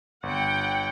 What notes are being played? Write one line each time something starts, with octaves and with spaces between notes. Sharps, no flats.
G1 F#5 G5